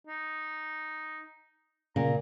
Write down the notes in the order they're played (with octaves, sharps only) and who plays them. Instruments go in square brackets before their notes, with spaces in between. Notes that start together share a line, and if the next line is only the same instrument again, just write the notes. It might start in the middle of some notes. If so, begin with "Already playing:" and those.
[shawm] D#4
[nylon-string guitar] A#2 [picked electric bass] C#3 [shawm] A#5